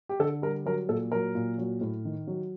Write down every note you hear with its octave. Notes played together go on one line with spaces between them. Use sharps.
G4
D3 A4
G3 A#4
F#3 A#4
A#2 A4
F#3 A#4
A#2
F#3
A2
D#3
F#3